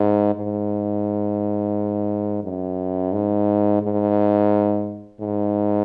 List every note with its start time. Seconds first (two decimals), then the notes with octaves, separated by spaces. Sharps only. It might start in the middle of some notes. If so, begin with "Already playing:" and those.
Already playing: G#2
0.35 G#2
2.43 F#2
3.13 G#2
3.82 G#2
5.21 G#2